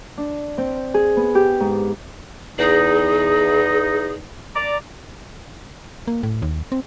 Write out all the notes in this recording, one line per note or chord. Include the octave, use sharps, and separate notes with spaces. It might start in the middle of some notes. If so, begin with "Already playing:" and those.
D4
C4
G#4
B3
G4
G#2
E2 D#4 G#4
D5 A#5 D6
A#3
A2
D#2
C4